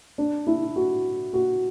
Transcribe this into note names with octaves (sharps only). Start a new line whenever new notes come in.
D4
E4
F#4
F#4